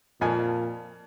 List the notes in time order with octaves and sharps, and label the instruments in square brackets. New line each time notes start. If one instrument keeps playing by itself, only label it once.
[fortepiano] F2 F3 G#5 [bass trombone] A#2